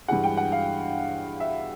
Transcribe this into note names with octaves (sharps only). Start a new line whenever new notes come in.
G2 E3 G#3 F#5
G5
F#5
F5
E5